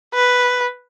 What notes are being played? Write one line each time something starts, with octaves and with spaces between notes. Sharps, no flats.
B4